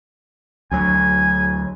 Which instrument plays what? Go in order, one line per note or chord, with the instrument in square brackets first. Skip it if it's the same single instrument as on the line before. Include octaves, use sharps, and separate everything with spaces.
[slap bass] D2 F#3 [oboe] G#5